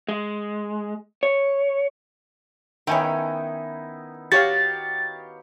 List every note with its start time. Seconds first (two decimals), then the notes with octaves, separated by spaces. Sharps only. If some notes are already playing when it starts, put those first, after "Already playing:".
0.09 G#3
1.23 C#5
2.87 D#3 B3 C#4 D#4 E4 G5 G#5
4.32 F#4 G4 C#5 F5 A6